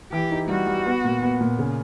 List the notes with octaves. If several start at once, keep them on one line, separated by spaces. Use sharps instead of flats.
E3 G4
D#4
G3 F#4
G3
B3
A#2
B3
A#2
C#3